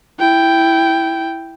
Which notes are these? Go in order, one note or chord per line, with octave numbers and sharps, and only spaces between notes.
E4 G5